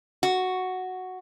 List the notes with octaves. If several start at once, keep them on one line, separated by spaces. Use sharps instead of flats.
F#4